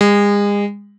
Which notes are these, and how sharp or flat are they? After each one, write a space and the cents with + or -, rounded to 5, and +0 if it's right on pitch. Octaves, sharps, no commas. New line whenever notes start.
G#3 -35